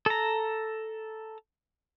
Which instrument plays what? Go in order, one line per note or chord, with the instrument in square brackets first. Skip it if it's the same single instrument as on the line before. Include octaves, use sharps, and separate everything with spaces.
[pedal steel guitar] A4 A#5